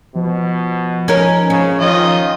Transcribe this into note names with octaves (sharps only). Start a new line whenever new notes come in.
B2 F3
C#4 D#4 A#4
C#3 C#4
D#3 F3 F4 D#5